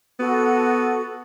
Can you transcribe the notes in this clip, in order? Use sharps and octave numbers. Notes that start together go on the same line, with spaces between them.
B3 F#4 A4